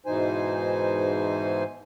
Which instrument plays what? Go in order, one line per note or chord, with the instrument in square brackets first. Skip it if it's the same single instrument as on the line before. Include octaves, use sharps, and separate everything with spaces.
[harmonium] G#2 B2 E3 D#4 C5 G#5